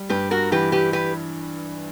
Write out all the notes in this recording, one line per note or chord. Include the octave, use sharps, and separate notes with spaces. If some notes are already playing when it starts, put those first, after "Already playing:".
Already playing: G3
G2 G4 B4
F#4 A#4
E3 G4 B4
G4 B4
G4 B4